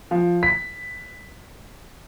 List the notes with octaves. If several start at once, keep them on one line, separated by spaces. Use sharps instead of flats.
F3
B6